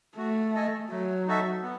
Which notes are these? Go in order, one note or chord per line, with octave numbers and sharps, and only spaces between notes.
A3 F#4
A4 D#5 G#5
F#3 A3
D#4 F#4 A4 E5
B3